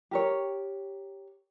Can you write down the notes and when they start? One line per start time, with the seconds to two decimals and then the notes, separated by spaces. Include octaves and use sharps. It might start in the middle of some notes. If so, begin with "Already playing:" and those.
0.11 G4 A#4 C#5